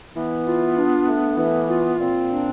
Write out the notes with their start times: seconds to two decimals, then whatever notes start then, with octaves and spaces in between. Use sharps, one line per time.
0.15 E3 B3
0.46 F4
0.77 D4
1.07 A3
1.37 E3
1.68 F4
1.99 A#2 C4
2.31 D4